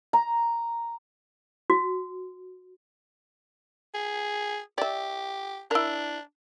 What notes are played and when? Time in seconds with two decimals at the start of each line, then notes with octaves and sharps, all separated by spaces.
0.13 A#5
1.70 F#4
3.94 G#4
4.78 G4 D5 E5
5.71 D4 E4 A#4